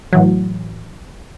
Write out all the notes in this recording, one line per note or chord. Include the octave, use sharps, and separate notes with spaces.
A2 E3 F#3